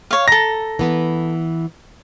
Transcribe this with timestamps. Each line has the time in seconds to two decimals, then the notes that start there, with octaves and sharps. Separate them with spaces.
0.11 C#5 F5
0.28 A4 A#5 A#6
0.79 E3 B3 B4